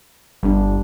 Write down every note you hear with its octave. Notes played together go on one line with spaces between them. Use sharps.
G1 G3 D4